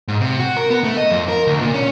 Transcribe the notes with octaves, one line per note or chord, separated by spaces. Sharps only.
G#2
C3
F#4
A#4
B3
A3
D#5
F2
A#4
D2
A#2
C#4